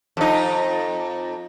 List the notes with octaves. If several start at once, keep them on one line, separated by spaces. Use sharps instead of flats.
F2 D#4